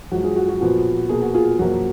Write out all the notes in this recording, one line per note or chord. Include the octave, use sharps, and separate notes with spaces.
F#2 F3 G#3 F#4
F4 G#4
F#4
F#4
A#2 F3 B3 F#4
B2 A#3 G#4
F#4
F4 G#4
F#2 F3 A#3 F#4